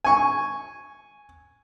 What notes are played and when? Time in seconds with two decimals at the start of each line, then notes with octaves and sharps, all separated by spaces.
0.05 G#5 C#6